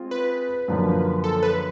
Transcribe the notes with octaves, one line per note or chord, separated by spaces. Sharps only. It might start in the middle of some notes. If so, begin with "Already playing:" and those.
Already playing: G#3 C4 F4 G#4
B4
F#2 D3 F3 A#3
A4
B4